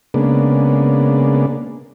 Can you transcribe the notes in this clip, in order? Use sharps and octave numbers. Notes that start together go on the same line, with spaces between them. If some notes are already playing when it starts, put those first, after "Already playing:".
C#3 G#3 A#3 B3 D4